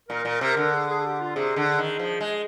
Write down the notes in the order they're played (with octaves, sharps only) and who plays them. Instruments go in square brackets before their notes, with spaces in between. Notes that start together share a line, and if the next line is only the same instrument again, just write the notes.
[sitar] A#2 [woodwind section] A#4
[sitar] A#2
[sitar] C3 [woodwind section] A#4
[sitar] D3
[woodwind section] G#4
G#4
G#4
G4
F4
[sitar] C3 [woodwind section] G#4
[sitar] D3
D#3
F3
G#3